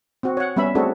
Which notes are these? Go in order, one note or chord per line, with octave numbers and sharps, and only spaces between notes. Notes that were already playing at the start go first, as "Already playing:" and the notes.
C4 F#4
C#5 F#5
G3 B3 C#4 E5 B5
A3 C4 D4 F#4 G#4 A4